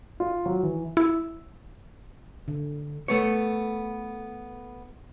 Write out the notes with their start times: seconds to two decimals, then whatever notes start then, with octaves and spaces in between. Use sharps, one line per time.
0.20 F4
0.46 F#3
0.63 E3
0.97 E4
2.48 D3
3.08 A3 B3 C#5